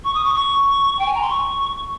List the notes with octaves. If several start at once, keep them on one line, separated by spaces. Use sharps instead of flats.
C#6
D#6
C#6
C#6
G5
G#5
A#5
C6
C#6